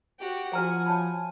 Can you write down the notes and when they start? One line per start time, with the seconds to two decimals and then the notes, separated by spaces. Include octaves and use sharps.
0.19 F#4 G4
0.53 F3 F#4 C5 F#5 G#5 A#5 F6
0.86 C#5 A5 B5